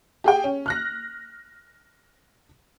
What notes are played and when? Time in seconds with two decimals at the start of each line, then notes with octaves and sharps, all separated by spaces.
0.24 G4 G#4 G5
0.44 C#4
0.66 F6 F#6 A#6